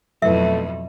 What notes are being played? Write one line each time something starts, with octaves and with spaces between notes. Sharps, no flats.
F2 B2 F#3 A3 E4 B4 E5